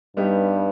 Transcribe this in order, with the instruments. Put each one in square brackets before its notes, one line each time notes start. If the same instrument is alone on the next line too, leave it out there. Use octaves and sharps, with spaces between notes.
[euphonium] G2 [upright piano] G3 B3 D#4 G4